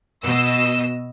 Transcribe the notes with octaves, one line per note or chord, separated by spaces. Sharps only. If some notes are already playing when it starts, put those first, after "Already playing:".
B2 D#5 E6